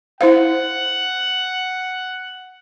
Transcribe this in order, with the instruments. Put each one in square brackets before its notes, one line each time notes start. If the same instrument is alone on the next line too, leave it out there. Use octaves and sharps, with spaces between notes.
[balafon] E4 C5 F5 [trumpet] F#5